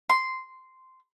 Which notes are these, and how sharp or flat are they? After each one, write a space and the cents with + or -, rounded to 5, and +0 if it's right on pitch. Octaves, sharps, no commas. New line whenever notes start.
C6 -10